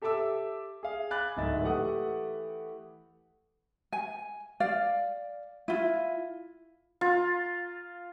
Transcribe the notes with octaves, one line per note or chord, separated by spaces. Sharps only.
G4 A4 E5 A5 D6 E6
G#4 F5
G#5 B5 D6 F#6 A6
D1 G#2 D#5 E5 A6
E3 A3 G4 F#5 D#6
G#5
D5 F5
E4 F4
F4